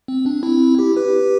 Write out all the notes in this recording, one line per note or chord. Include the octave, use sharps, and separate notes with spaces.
C4
D4
C4 E4
E4 G4
G4 B4